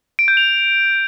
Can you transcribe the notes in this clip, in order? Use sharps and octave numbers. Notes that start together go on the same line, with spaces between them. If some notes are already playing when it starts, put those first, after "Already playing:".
D7
G6
F7